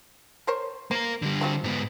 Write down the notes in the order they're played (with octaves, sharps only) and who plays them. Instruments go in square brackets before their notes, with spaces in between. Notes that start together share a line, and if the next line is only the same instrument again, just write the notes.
[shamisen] A#4 C5 C#5
[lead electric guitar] A#3 A#4 [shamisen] C5
[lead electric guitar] D3 G3
[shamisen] F3 F#3 C4
[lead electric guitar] G#2 B3